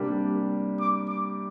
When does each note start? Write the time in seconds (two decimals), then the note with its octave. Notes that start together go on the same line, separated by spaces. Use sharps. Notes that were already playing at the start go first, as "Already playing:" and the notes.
Already playing: C3 G3 A#3 D4 G4
0.80 D6
1.09 D6